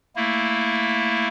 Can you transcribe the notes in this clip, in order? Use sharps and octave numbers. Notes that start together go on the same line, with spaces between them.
A3 A#3 E4